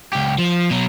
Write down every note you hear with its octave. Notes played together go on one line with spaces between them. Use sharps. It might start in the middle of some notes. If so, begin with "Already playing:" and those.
C#2 G4
F3
B2 F#3